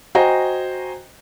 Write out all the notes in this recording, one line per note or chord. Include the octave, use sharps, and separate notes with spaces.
F#4 C5 D#5 G5 G#5 A#5